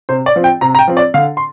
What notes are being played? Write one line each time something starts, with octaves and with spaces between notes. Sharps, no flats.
C3 C5
D5
F3 C4
G5
C3 A#5
A#5
G5
F3 C4
D5
D3 F5
C6